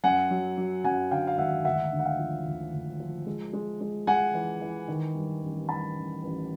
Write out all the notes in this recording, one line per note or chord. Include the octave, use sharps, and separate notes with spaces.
F#2 F#5 G#5
F#3
F#3
F#2 F#5 G#5
D3 F5 G5
F5
G#1 E5 F#5
D2 E5 F#5
D3
F#5
F5 G5
F3
D2
D2
F3
G#3
G#3
G#3
G#3 F#5 G#5
E3
E3
D#3
G2
A1
G2 A5 B5
A1
A1